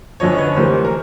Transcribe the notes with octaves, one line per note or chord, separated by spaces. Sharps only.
F#2 D3 F3 C#5 D#5
B4 C#5
D2 C3 E3 A#4 C5
A#4